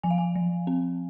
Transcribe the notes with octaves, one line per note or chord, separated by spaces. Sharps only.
F3 G#5
F5
G#5
F3
C4